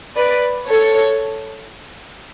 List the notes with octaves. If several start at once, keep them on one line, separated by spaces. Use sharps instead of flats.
B4 D5
A4 C#5